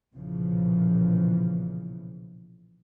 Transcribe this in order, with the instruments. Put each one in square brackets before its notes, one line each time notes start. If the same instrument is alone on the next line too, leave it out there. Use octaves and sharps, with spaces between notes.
[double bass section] B1 A#2 C#3 E3 F3